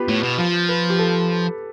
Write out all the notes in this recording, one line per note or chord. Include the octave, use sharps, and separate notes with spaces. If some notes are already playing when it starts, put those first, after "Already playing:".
Already playing: B3 F4 G4 B4
A2
B2
F3
B4
G4
A4